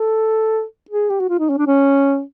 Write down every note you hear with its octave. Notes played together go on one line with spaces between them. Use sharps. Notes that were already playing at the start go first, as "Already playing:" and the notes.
Already playing: A4
G#4
G4
F#4
F4
D#4
C#4
D4
C#4